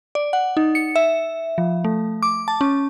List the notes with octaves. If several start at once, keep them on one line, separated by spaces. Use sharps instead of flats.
D5
F#5
D#4
C#7
E5
F3
A3
D6
A5
C#4